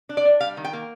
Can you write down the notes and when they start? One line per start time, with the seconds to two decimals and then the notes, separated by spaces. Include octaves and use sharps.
0.09 D4
0.17 D5
0.25 D4
0.40 G3 F5
0.57 D#3
0.65 G5
0.73 A#3